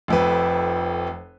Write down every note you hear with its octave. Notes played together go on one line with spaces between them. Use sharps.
F1 F2 B4